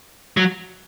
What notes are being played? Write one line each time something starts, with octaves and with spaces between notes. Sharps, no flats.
F#3